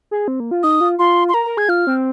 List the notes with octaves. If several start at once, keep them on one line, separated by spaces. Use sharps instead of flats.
G#4
C4
A#3
F4
D#4 D#6
F4
F4 C6
C6
A#4 A#5
A#4
G#4 G#6
F4 F6
C4